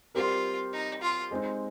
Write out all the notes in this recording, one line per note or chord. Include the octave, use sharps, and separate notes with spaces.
G3 C4 F4 G4 A#4
D#4
F4
G#3 C4 D#4